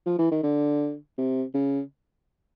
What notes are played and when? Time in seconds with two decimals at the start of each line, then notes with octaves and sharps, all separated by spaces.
0.06 F3
0.19 E3
0.31 D#3
0.43 D3
1.18 C3
1.54 C#3